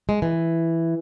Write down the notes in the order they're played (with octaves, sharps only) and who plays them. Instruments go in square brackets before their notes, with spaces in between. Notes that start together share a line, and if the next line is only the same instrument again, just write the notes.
[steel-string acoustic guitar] G#3
E3